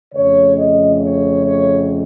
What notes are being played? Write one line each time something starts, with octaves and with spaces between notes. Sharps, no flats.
F2 C#3 A3 C#5
D#5
C#5
C#5